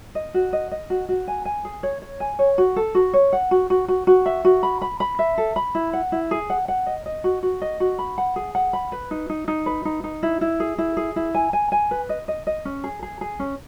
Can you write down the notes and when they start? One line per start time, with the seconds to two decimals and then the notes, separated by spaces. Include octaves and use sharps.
0.15 D#5
0.34 F#4
0.53 D#5
0.71 D#5
0.90 F#4
1.09 F#4
1.28 G#5
1.45 G#5
1.65 G#4
1.83 C#5
2.02 C#5
2.20 G#5
2.39 C#5
2.58 F#4
2.76 A4
2.95 F#4
3.13 C#5
3.33 F#5
3.51 F#4
3.70 F#4
3.88 F#4
4.07 F#4
4.26 E5
4.45 F#4
4.63 B5
4.81 B5
5.00 B5
5.19 E5
5.38 A4
5.56 B5
5.75 E4
5.93 F#5
6.12 E4
6.31 G#4
6.50 F#5
6.68 F#5
6.87 D#5
7.06 D#5
7.24 F#4
7.43 F#4
7.62 D#5
7.80 F#4
7.99 B5
8.18 F#5
8.36 G#4
8.55 F#5
8.73 B5
8.92 B4
9.11 D#4
9.30 D#4
9.48 D#4
9.66 B4
9.85 D#4
10.04 D#4
10.23 E4
10.41 E4
10.60 G#4
10.78 E4
10.97 G#4
11.16 E4
11.34 G#5
11.53 G#5
11.72 G#5
11.91 B4
12.09 D#5
12.28 D#5
12.47 D#5
12.65 C#4
12.84 G#4
13.03 G#4
13.21 G#4
13.40 C#4